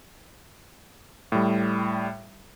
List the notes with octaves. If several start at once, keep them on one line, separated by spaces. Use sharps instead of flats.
A2 G3